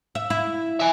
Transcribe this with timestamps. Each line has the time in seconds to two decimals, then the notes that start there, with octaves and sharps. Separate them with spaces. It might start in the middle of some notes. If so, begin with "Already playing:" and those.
0.15 E5
0.30 E4
0.80 E5 G#5